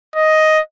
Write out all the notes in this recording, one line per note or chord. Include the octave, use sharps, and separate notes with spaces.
D#5